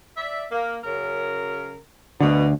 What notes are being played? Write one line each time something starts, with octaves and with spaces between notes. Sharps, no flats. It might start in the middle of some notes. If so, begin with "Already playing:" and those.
D5 E5
A#3
F#2 C#3 A#4
D2 B2 D3